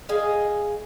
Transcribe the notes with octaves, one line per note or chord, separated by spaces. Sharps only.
G#4 D#5 F5